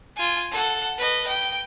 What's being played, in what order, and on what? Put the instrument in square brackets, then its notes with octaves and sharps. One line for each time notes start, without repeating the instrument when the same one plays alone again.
[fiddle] F4 G#5
A4 F#5
B4 D#5
G5